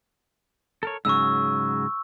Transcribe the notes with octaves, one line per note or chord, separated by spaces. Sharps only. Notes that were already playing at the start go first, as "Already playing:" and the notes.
A4 A#4 C#5
G#2 C#3 F#3 C#6 E6